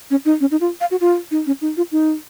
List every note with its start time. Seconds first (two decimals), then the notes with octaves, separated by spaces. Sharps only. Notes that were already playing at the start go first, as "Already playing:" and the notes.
0.11 C#4
0.25 D#4
0.41 C#4
0.51 D#4
0.61 F4
0.81 F5
0.91 F#4
1.01 F4
1.31 D#4
1.47 C#4
1.61 D#4
1.77 F4
1.92 D#4